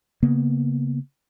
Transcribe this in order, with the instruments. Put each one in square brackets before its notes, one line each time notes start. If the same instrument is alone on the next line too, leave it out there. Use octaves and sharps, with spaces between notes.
[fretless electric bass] C#3 A#3 B3